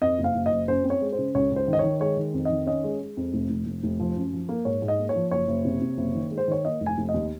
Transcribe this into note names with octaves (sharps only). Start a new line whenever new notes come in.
F2 D#5
F#1
F5
F#1
D#5
F#1
F#2 C5
C4
C#5
G#3
C5
C#3
C#2 C#5
C#2 C5
D#3
D#5
D#3 C#5
G#3 C#5
D#3
F2
D#3 D#5
C#4 D#5
G#3
G#3
F2
F1
F1
F1
F1
F3
F#2
F3
A#3
G#2 C#5
G#2
D#5
A#3
C#5
F3
F#1 C#5
F#1
C3
C3
F#1
D#3
G#3
C5
D#3 C#5
A#3 D#5
F1
G#5
F1
D#5
D#2